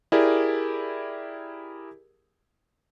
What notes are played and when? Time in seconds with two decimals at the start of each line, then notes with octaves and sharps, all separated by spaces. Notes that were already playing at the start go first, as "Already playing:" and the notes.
0.12 E4 G4 G#4 A#4 D5